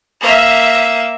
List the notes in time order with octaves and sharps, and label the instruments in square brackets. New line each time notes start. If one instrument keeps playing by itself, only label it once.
[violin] A#3 E5